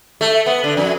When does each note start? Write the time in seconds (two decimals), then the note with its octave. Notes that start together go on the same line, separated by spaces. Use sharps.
0.21 A3
0.46 B3
0.64 D3
0.77 F2